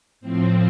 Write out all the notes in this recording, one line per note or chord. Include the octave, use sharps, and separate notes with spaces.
A2 F3 C4